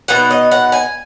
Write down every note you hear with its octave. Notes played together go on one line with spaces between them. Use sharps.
B2 B3 D#4 F#5
D#5
F#5
G#5